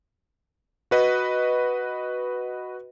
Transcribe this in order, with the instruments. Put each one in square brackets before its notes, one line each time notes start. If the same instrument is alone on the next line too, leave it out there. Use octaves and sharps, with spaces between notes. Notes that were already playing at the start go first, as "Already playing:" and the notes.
[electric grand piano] F#4 B4 D#5